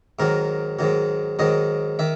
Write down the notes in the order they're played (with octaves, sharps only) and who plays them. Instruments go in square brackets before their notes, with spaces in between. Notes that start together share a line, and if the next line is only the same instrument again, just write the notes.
[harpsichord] G#2 D#3 F#3 A#4
G#2 D#3 F#3
G#2 D#3 F#3 D#5
D#3 E5